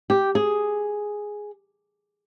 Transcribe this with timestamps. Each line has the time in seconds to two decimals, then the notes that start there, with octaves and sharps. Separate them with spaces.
0.10 G4
0.35 G#4